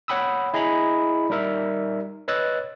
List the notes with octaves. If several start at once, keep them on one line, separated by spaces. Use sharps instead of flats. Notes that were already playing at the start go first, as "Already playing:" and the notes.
C#5 F#5 G5 B5 D#6 E6
E4 G#4 D#5 A#5 B5
G3 D#4 A#4 E5
B4 C#5 D#5 E6 F#6 A6